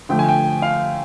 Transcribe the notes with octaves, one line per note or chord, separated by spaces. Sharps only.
D3 F3 A3 G5
G#5
G5
F5